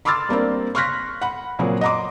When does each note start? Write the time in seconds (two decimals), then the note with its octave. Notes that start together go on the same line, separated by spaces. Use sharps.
0.05 B5 C6 D6 E6 F6 A6
0.29 G3 A#3 C4 D4
0.75 C6 C#6 F6 F#6 A#6 B6
1.21 F#5 B5
1.59 A#2 C#3 F#3 C4 G#4
1.81 D#5 F#5 A#5 C6 D6